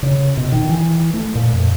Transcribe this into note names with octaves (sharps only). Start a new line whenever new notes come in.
C#3
B2
D#3
E3
A3
A#2
F2